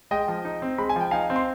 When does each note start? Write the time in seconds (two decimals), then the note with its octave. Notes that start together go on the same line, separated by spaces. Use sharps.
0.11 G#3 D#5 G5
0.28 F3
0.45 D#4
0.62 C4
0.78 G#3 B5
0.89 G#5
0.96 F3 G5
1.11 D#4 F5 G#5
1.30 C4
1.36 C6